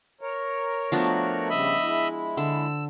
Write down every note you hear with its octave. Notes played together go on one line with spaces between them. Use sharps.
A#4 C#5
F3 A3 B3 D4 F#4
C#3 G3 D#5 E5 B5
G#3 E4
D3 E6